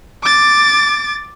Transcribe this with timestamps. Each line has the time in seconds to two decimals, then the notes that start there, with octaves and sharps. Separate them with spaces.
0.23 D6 A6